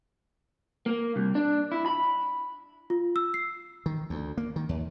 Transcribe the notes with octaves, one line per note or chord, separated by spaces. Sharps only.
A#3
C2
D4
E4
B5
F4
E6
C7
D#3
D2
A#3
D#3
D#2